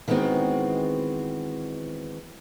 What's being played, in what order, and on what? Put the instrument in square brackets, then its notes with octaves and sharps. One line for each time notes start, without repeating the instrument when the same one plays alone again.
[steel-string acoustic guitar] D#3 E3 G#3 B3 C4 F#4